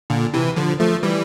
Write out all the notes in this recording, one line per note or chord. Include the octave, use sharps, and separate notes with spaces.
A#2 D3
C3 E3
D3 F3
F3 A3
E3 G3